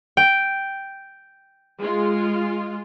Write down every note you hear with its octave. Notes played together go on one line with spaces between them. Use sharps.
G5
G#3 F4